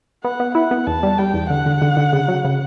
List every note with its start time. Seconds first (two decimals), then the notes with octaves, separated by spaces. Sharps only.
0.24 B3 F#5
0.40 B3
0.55 E4 F#5
0.71 B3
0.87 E2 A5
1.03 G3
1.18 G3 G5
1.34 E2
1.50 D3 F#5
1.66 D3
1.82 D3
1.97 D3
2.13 C#3
2.28 F#3
2.45 C#3